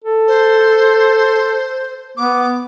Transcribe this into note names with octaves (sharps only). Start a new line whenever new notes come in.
A4
C5
B3 D6